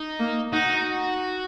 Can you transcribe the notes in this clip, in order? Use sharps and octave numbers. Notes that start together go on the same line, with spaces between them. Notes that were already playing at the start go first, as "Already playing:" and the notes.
Already playing: D#4
A#3
D#4 F#4